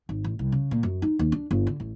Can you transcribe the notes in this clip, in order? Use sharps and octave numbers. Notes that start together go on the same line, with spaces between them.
G#1
A1
C2
C#3
A#2
F#2
D#4
D#2
D4
G1
D3
A1